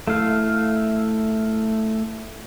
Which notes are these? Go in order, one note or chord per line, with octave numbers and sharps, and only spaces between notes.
A3 E4 F5